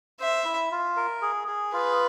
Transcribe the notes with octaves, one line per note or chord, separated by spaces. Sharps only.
C5 E5
E4
F4
A#4
G#4
G#4
F4 B4